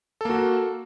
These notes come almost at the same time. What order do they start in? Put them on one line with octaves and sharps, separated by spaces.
A4 A#3 F#4